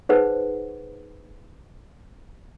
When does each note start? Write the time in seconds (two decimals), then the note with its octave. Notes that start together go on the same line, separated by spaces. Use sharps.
0.09 D#4 G#4 B4 C5 F#5